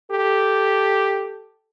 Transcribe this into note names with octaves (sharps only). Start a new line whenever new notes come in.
G4 A4